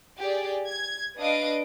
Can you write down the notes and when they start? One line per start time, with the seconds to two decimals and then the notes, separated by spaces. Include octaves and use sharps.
0.18 G4 G#4 D5
0.68 G#6
1.17 D4 B4 D#5 F5 D#6 D7